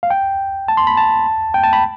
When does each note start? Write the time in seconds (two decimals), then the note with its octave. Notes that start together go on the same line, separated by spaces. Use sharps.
0.03 F5
0.10 G5
0.68 A5
0.77 C6
0.87 B5
0.97 A5
1.54 G5
1.63 A5
1.73 B5